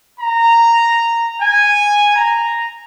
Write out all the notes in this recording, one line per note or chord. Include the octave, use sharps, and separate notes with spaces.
A#5
G#5
A#5